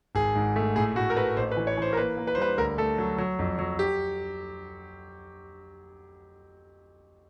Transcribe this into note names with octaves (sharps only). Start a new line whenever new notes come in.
G#1 G#4
G#2
A3
A2 G#4
A2 F#4
A#4
A3 B4
A1 C5
B4
E3
C#5
E3 C5
A#4
A#3 B4
A#3
B4
C5
G3 B4
D2 A#4
A3 A4
F#3
F#3
F2
F#3
G4